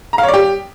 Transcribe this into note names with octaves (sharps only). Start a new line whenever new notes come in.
A#5
F5
C#5
D5
G4